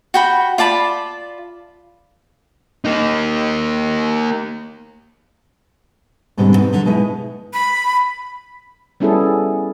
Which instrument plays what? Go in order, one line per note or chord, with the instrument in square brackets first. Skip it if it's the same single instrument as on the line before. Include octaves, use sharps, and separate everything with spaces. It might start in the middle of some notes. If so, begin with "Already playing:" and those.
[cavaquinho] F#4 G5 B5
F4 D5 A5 B5
[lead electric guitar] A#3 D#4
[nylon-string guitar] G#2 B2 D3 G3 C4
B3 C4 D#4
D3 F#3
B2 G#3 D#4 E4
[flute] B5
[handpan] G3 B3 C#4 E4 G#4 A4